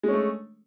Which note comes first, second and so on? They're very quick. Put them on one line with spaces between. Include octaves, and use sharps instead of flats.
G#3 C#4 A3